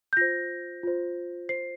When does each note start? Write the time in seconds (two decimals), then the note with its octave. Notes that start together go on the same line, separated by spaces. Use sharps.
0.13 G6
0.17 F4 C5 A#6
0.83 F4 C5
1.49 F4 C5 C7